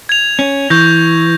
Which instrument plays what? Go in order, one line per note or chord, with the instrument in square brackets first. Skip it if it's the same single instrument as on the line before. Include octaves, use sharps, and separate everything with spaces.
[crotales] G#6 F7
[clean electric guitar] C#4
[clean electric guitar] E3 [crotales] C#6 G6 A#6